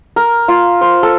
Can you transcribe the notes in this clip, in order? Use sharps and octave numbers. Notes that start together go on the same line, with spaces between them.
A#4
F4
C5
A4